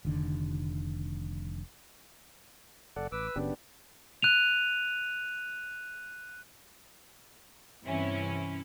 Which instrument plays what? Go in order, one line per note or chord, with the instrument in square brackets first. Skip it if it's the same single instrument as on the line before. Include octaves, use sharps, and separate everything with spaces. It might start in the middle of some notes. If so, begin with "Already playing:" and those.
[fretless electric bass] F1 D3 D#3
[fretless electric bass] F#1 [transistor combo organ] A4 D5 F#5
[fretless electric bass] A1 [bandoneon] B4 E6 [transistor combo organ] D6
[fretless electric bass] F#1 F#2 C#3 [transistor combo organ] B3 D4 G4
[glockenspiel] F#6 D#7 F7
[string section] G2 C3 E3 C#4 E4